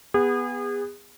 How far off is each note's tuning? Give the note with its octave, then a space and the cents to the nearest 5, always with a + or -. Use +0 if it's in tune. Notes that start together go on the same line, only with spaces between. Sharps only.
B3 +0 G#4 -35